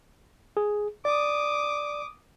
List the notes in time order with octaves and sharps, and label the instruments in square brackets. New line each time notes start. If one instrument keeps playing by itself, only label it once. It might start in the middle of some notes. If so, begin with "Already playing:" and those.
[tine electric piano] G#4
[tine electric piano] D5 [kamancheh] D6 D#6